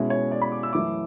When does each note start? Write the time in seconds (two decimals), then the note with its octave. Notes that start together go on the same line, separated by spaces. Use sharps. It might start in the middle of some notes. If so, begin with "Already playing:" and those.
Already playing: B2 G#3 C#4 E4
0.10 C#5
0.31 D5
0.42 B5
0.52 D6
0.63 E6
0.73 F#2 E3 A3 E4 D6